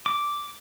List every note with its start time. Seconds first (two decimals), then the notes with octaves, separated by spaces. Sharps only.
0.06 D6